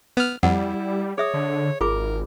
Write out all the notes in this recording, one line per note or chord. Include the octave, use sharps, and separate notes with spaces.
B3 F6
F2 G3 E4 F#5
G#4 C#5 E5 D#6
D3
G#1 F4 G#4 A#4 D6